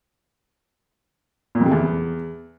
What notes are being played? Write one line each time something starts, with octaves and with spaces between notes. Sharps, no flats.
A#2
F2
C3
E2